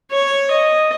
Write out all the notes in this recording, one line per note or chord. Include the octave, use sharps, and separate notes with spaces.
C#5
D#5